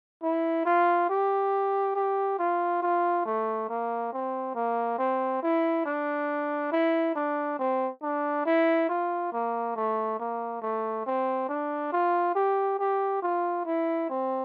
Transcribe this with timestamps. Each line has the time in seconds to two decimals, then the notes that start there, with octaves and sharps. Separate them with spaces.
0.23 E4
0.65 F4
1.10 G4
1.96 G4
2.39 F4
2.83 F4
3.26 A3
3.69 A#3
4.13 C4
4.55 A#3
4.99 C4
5.43 E4
5.86 D4
6.72 E4
7.16 D4
7.59 C4
8.02 D4
8.46 E4
8.89 F4
9.33 A#3
9.76 A3
10.20 A#3
10.62 A3
11.07 C4
11.49 D4
11.92 F4
12.36 G4
12.79 G4
13.22 F4
13.66 E4
14.10 C4